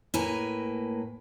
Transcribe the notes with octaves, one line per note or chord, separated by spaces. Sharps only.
A2 A#3 B4 G#5